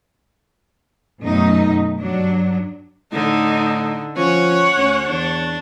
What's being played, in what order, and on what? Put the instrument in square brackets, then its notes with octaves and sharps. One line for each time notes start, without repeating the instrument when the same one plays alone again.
[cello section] F#2 B2 A3 D#4
G2 F#3 D4
[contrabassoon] A2 [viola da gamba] D3 [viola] D#4
[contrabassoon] F3 [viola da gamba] C#4 [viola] C#5 F#5
[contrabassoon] D2 [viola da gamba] C#4
[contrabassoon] E2 [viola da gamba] D4